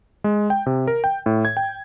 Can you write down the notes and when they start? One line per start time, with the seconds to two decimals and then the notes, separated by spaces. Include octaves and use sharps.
0.24 G#3
0.50 G5
0.66 C3
0.87 A#4
1.04 G5
1.26 A2
1.45 G#6
1.57 G5